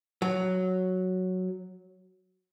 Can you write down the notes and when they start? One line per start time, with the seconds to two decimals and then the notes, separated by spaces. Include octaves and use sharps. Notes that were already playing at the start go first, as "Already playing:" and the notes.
0.22 F#3